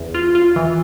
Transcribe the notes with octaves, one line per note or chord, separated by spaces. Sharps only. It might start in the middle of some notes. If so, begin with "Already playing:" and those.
Already playing: E2
F4
F4
E3